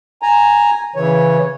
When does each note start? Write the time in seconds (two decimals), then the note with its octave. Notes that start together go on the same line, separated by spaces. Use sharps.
0.22 G#5 A#5
0.96 C#3 E3 C#5